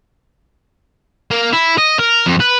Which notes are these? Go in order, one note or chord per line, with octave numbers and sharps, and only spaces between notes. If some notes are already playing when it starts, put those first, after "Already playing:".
A#3
E4
D#5
A#4
F2
B4